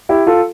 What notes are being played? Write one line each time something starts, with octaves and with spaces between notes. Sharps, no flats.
E4 G4
F4 A4